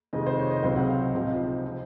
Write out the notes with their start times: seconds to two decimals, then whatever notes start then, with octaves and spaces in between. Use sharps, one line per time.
0.13 F2 C3 D#3 G#3 D#5
0.26 C5
0.39 C#5
0.51 D#5
0.63 C#2 C3 F#3 C4 C5
0.76 F#5
0.89 F5
1.01 D#5
1.14 C#2 C3 F3 C4 D#4
1.65 F3 C4